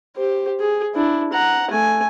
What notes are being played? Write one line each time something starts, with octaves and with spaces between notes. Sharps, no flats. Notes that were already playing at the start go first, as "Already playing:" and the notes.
G4 C5
G#4
D4 E4
F#5 A#5
A3 G#5